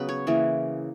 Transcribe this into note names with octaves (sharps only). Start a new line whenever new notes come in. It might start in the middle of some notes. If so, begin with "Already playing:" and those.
Already playing: C#3 F#3 B3 B4
C#5
C#3 E3 A#3